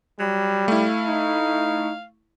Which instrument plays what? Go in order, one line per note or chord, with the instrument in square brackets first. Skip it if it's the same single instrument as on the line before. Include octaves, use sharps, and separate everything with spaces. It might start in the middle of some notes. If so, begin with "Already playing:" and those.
[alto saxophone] F#3 [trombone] G3
[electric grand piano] A3 E4 [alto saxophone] F5
[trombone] D#4